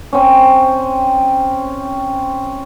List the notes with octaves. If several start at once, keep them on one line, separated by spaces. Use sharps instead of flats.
C4 C#4